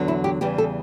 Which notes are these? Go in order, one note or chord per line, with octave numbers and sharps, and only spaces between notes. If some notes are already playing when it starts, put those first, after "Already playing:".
Already playing: E2 D3 F#3
E4
G4
E2 C#3 E3 G3 G4
A4